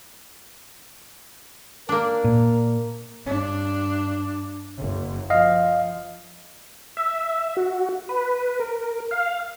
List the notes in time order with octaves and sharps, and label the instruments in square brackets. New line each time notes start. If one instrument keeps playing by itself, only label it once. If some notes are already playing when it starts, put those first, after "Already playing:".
[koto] A#3 D4 [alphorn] A#4
[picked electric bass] A#2
[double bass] G2 D4
F#1
[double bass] F3 [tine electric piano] D#5 F5
[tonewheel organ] E5
F#4
B4
A#4
F5